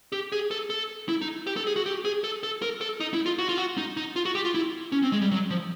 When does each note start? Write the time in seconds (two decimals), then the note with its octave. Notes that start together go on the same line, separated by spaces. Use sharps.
0.12 G4
0.32 G#4
0.51 A4
0.70 A4
1.09 E4
1.22 D#4
1.47 G4
1.56 A4
1.67 G#4
1.76 F#4
1.86 G4
2.05 G#4
2.24 A4
2.43 A4
2.62 A#4
2.81 A4
3.00 D#4
3.14 E4
3.26 F4
3.39 F#4
3.49 F4
3.58 F#4
3.77 D#4
3.97 D#4
4.16 F4
4.25 F#4
4.35 G4
4.45 F4
4.54 E4
4.92 C#4
5.03 C4
5.12 G#3
5.21 G3
5.31 F#3
5.50 F3